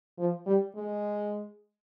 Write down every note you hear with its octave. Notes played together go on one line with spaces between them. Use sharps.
F3
G3
G#3